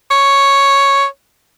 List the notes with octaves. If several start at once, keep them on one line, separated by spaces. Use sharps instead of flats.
C#5